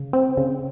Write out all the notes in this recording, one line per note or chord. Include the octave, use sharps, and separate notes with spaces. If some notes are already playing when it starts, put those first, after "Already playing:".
Already playing: C#3
C4
C#3